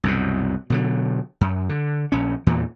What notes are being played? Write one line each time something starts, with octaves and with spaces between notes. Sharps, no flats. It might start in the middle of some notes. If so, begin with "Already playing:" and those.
C2 F#2 B2
B2 D3 F#3
F#2
D3
A#1 C#4
E2 A#2 E3